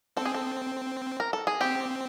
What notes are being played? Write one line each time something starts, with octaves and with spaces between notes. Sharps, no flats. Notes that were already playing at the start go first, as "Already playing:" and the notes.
C4 A4
G#4
A4
A#4
A4
G#4
C4 G4